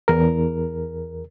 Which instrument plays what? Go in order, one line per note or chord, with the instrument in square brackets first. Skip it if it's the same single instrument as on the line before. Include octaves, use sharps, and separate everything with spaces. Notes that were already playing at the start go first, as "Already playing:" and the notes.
[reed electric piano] E2 A#4